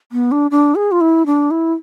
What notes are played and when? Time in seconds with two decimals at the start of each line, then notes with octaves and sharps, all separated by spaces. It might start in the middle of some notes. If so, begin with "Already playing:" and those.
0.12 B3
0.32 D4
0.51 D4
0.75 G#4
0.92 F4
1.01 E4
1.26 D4
1.51 E4